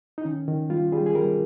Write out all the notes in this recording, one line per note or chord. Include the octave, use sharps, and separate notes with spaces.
D#4
D#3 C#4
D#3
G3 F4
G3 G#4
G#4
G3 A#4